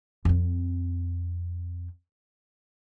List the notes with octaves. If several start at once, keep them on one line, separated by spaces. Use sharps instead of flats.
F2 C4